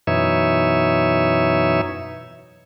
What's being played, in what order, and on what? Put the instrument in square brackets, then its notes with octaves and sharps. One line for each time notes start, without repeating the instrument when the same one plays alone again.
[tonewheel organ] F#2 B2 E3 D#4 C#5 E5